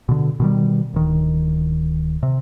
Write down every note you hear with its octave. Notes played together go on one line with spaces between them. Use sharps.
B2 D3
B2 D#3 G3
D1 D#3
C3